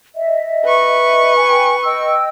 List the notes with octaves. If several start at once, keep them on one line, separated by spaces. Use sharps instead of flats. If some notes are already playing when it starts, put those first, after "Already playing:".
D#5 E5
B4 C#6
G5 G#5
D#5 G5 E6